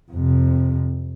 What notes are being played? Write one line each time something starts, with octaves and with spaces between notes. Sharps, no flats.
F2 C3